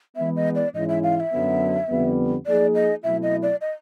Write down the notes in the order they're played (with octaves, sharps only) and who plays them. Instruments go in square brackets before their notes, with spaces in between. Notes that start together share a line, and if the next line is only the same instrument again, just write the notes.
[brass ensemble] E3 G#3 B3 [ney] E5
[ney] D#5
D5
[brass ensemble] G#2 E3 G#3 C#4 E4 [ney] D#5
[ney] E5
F5
F5
E5
[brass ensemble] F#2 D3 F#3 B3
F2 D3 G3 B3
[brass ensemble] F3 A#3 D#4 G#4 [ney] D5
[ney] D#5
[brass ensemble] B2 F#3 A3 C4 E4 [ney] E5
[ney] D#5
D5
D#5